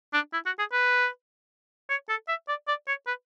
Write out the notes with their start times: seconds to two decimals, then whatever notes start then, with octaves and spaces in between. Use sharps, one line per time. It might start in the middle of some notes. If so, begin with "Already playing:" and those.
0.14 D4
0.33 E4
0.46 F#4
0.59 G#4
0.72 B4
1.90 C#5
2.09 A4
2.28 E5
2.48 D5
2.68 D5
2.88 C#5
3.07 B4